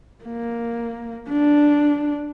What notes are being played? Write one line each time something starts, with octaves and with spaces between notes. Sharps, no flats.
A#3
D4